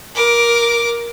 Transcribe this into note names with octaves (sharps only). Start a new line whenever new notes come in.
A#4 D6